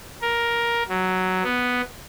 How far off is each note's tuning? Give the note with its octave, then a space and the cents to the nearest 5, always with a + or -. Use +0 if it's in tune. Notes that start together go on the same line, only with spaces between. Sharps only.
A#4 +10
F#3 +5
B3 +0